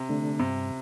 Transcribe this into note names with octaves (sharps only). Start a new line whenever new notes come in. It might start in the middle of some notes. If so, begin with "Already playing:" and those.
Already playing: C3
D3 A3 D4
G2 C3